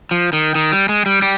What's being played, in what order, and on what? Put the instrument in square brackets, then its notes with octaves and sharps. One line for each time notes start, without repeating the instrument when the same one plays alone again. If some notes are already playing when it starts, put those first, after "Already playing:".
[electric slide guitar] F3
D#3
D#3
G3
G#3
G3
G3